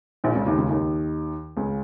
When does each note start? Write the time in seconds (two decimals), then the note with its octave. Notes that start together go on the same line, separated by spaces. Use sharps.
0.24 A#1 A#2
0.35 C#2 C#3
0.46 D#2 D#3
0.57 C#2 C#3
0.69 D#2 D#3
1.57 C#2 C#3